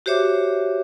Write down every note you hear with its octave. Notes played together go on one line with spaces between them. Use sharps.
F#4 G4 C5 C#5 E5 D6